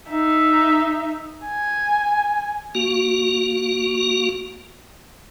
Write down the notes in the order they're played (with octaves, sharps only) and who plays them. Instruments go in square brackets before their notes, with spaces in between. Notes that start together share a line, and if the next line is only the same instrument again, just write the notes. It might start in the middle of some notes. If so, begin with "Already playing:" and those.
[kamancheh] D#4 E5
G#5
[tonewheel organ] A#3 F#4